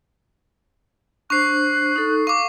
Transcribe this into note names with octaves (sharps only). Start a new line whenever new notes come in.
D4 C5 C#6 F#6 C7
D#4 A4
F5 C#6 D6